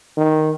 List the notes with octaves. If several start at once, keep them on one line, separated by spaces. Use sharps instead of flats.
D#3